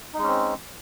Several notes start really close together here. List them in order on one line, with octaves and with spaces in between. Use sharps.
D#4 G#3 C#4 C4